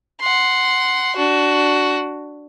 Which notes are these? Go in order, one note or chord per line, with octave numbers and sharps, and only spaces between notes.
F#5 C6
D4 F#4